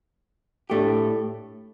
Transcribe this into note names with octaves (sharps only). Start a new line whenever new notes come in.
A2 A3 D4 G4